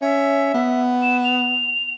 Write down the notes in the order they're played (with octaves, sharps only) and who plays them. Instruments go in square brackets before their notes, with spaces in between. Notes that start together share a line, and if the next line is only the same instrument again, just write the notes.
[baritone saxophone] C#4 [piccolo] E5
[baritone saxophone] B3
[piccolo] E7
F7